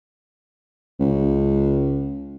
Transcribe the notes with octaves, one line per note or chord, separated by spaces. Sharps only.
C#2